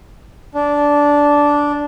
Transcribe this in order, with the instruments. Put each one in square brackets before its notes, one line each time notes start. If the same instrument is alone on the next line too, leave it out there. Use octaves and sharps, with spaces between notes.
[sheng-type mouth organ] D4